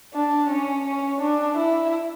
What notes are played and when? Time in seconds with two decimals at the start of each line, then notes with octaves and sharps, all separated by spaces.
0.14 D4
0.50 C#4
0.85 C#4
1.21 D4
1.58 E4